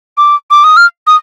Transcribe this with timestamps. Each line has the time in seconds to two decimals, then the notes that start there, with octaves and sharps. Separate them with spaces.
0.17 D6
0.50 D6
0.64 D#6
0.77 F6
1.07 D#6